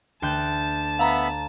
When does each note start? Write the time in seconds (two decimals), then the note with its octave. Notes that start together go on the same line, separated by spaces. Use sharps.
0.22 D2 G5 A5 F#6
0.99 B3 E5 F5 A#5 B5